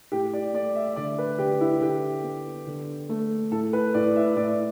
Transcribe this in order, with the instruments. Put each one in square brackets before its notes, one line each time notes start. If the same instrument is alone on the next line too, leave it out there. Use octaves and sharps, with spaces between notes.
[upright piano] A2 G4
D5
A3 D5
E5
D3 D5
B4
D3 G4
E4
D3 G4
B3
D3
A3
A2 A4
B4
A2 D5
E5
A2 D5